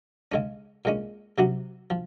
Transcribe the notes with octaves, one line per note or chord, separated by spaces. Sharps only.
C#3 G#3 C#4
A#2 G#3 C#4
C3 F#3 C#4 F#4
F3